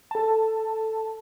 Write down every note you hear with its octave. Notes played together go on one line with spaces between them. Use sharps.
A4 A5